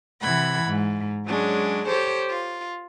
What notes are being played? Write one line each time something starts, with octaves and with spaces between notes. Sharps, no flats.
C3 E3 F#5 B5 G#6
G#2
F#3 G#3 C#4 D4
G4 A4 C5 C#5
F4